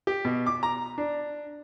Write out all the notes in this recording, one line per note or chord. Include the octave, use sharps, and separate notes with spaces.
G4
B2
D6
A#5
D4